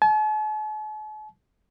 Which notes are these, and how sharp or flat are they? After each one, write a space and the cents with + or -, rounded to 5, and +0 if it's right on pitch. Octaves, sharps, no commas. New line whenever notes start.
A5 -45